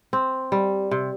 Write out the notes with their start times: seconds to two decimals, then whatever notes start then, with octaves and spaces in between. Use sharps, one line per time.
0.13 C4
0.52 G3
0.91 C3